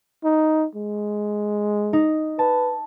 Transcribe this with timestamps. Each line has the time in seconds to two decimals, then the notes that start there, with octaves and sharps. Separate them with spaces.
0.24 D#4
0.75 G#3
1.93 D#4
2.39 B4 A5